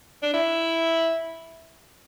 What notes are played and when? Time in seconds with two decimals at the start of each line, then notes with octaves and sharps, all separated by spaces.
0.23 D4
0.33 E4